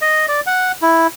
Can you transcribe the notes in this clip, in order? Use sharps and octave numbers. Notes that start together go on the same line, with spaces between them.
D#5
D5
F#5
E4